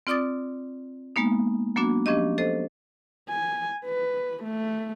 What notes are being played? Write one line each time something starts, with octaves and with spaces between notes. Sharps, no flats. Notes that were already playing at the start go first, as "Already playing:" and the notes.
C4 F4 D5 D6 D#6 A6
G#3 A#3 B3 D#4
F#3 A#3 B3 D4 F#4
F3 C#4 D4 G4 D#5
A4 C5 D#5
G#5
B4
A3